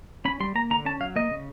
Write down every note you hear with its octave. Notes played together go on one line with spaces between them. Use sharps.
C#4 B5
G3 C6
A#3 A#5
D3 A#5
C#4 A5
F#3 F5
A#3 D#5
C#3